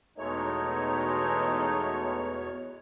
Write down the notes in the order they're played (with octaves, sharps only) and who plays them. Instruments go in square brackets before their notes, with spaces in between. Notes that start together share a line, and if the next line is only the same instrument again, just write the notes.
[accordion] E2 B2 C#5 [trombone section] G#3 A3 D#4